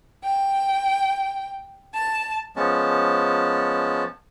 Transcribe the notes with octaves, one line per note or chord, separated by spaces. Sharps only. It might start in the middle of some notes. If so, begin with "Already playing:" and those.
G5
A5
F3 G#3 B3 C#4 A5